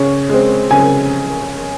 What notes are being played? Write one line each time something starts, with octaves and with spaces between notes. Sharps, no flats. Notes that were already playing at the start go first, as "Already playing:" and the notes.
Already playing: C#3 C#5
G#3 C4
C#3 G#5